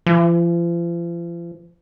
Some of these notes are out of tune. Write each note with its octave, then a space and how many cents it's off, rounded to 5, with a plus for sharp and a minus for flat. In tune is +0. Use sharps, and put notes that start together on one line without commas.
F3 -40